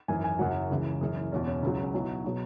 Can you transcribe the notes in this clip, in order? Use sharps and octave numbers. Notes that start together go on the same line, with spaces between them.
G#1 F#2 E3 G#5
G#5
F#1 F#2 F#3 F#5
C#2 C#3 E3
F#1 F#2 E3 G#4
C#4
E1 E2 B2 C#4
C#4
C#2 C#3 F#3 E4
C#4
B1 B2 F#3 E4
B2 F#3 G#4